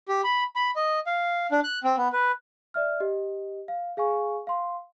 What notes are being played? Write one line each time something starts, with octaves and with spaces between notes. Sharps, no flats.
G4
B5
B5
D#5
F5
D4
F#6
C4
B3
B4
D5 E5 F6
G4 D#5
F5
G#4 F5 G#5 C#6
F5 C6